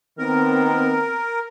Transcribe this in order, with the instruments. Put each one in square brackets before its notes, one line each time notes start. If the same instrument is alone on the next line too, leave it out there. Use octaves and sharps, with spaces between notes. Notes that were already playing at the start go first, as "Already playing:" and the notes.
[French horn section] D#3 B3 C4 [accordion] A#4